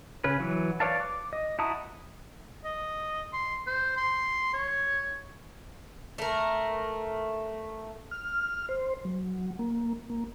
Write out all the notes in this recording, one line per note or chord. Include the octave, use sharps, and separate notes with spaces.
C#3 C#4 B4
E3 F#3
B4 C#5 D5 F5 A5
D6
D#5
E4 F#4 A5 A#5 D#6
D#5
C6
C5
C6
C#5
A3 A#4
F6
C5
F#3
A#3
A#3